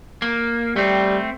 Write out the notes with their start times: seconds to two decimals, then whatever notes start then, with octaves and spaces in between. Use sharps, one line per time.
0.22 A#3
0.76 G3 A3 C4